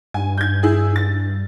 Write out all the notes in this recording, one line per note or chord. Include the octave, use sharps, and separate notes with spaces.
G2 G#5
G6 G#6
E4 G#4
A6